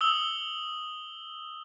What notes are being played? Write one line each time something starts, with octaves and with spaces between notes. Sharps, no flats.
D#6 E6 G7